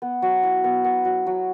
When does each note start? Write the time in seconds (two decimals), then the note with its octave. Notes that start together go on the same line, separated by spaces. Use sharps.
0.02 B3
0.22 F#3
0.43 E4
0.64 B3
0.84 B3
1.05 F#3
1.26 F#3